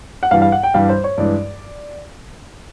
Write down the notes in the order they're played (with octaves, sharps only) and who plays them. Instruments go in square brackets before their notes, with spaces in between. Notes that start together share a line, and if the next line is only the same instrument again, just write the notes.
[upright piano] F#5
[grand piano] G2 E3 G3 [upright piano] F5
[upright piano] F5
F#5
G5
[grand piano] G2 E3 G3 [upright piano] F5
[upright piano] C5
C#5
[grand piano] G2 E3 G#3 [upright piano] D5